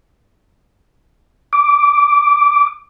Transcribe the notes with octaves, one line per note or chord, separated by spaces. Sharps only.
D6